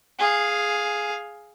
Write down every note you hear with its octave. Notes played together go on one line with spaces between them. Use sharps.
G#4 F5